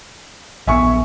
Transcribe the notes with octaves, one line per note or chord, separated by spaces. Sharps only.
A#1 F3 B3 E5 G#5 C#6